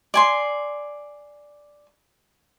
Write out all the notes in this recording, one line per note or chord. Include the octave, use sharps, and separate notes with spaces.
D5 G#5 C6